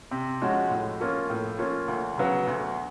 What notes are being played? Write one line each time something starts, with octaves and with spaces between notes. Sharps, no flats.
C3
F3 G#3 C#4 F#4
A2
F3 A#3 C#4 F4
A2
F3 A#3 C#4 F4
D2
C#3 F#3 B3
D2